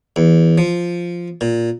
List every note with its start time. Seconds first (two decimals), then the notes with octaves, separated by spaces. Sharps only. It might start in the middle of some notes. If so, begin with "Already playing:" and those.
0.16 E2
0.58 F3
1.41 A#2